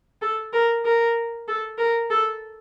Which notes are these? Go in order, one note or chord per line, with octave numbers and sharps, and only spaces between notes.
A4
A#4
A#4
A4
A#4
A4